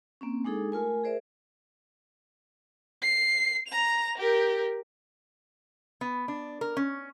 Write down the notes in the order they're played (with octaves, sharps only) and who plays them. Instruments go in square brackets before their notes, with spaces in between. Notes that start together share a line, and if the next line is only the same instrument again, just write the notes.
[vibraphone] A#3 C4 C#4
G#3 D4 D#4 G#4 A4
A3 F4 A#4 G#5
G#4 A#4 C5 D5 E5
[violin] C7
A#5 F7
G4 A#4
[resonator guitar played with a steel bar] B3
D4
A#4
C#4